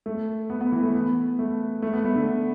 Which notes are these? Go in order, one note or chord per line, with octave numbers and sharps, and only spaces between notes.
A3
B3
B3
E3
A3
B3
A3
A3
B3
A3
D3